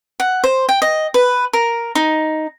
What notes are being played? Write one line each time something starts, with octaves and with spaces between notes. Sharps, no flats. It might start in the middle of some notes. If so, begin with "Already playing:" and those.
F#5
C5
G5
D#5
B4
A#4
D#4